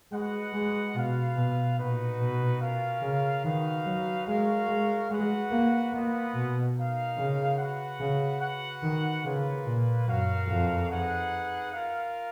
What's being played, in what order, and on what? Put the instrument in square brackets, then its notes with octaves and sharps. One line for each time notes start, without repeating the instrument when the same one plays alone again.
[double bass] G#3 [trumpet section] F#4 B4 D#5 F#5
[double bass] G#3
[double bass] B2 [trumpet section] F4 B4 F5
[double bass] B2
[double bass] A#2 [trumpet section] D#4 F#4 B4
[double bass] B2
[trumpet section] C#4 F4 A#4 F5
[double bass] C#3
[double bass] D#3 [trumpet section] D#4 F#4 B4 F5
[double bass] F#3
[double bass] G#3 [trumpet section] F#4 A#4 C#5 F5
[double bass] G#3
[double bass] G#3 [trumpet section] F#4 B4 F#5
[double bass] A#3
[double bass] A#3 [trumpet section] B3 F4 B4 D#5 F#5
[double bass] B2
[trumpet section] D#4 A#4 F5
[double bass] C#3
[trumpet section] F#4 B4 F#5
[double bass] C#3
[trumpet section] F#4 B4 F#5
[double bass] D#3
[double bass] C#3 [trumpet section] A#3 F4 B4
[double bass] A#2
[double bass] F#2 [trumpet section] F#4 A#4 F5
[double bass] F2
[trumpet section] D#4 G#4 B4 F#5
F4 A#4 F5